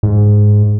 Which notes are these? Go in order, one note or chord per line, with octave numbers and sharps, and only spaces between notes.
G#2